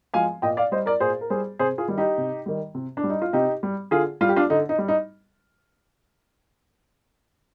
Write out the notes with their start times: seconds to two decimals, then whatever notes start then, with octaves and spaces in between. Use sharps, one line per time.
0.14 F3 G#3 F5 G#5
0.42 A#2 D#5 G5
0.57 D5 F5
0.72 G3 C5 D#5
0.86 A#4 D5
1.00 A#2 G#4 C5
1.21 A#4
1.30 G3 G#4 C5
1.59 C3 G#4 C5
1.78 F4 G#4
1.88 D#3 G3
1.98 D#4 G4
2.18 C3
2.46 D#3 G3
2.75 C3
2.97 D4
3.04 G3
3.10 D#4
3.22 F4
3.33 C3 D#4 G4
3.63 G3
3.91 D3 F4 G#4
4.21 G3 F4
4.29 G4
4.36 D4 F4
4.50 D3 D#4
4.69 D#4
4.78 G3
4.88 D#4